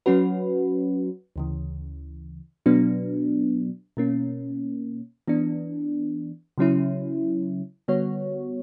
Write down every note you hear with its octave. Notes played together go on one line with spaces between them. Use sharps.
F#3 C#4 F#4 B4
D2 C#3 E3
B2 F#3 B3 D4
B2 A#3 C#4
E3 B3 D4
C#3 F#3 C#4 E4
D3 G3 B3 F#4 C#5